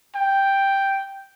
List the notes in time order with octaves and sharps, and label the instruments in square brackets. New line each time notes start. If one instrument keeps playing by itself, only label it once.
[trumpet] G5